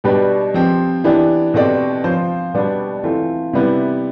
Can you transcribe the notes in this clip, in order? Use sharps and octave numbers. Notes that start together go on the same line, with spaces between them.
B2 G3 D4 G4 B4
F3 C4 G4
E3 B3 D4 G4
B2 A3 C4 G4 D5
F3 C4 F4 C5
B2 G3 B3 D4
E3 A3 C4 F4
C3 G3 B3 E4 B4